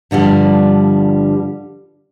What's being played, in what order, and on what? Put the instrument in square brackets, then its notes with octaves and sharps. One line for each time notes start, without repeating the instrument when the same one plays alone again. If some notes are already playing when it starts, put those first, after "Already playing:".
[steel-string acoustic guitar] G2 D3 F3 G3